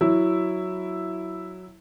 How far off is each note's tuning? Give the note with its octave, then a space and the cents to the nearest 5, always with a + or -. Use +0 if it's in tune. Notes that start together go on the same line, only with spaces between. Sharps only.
F#3 +0 E4 +0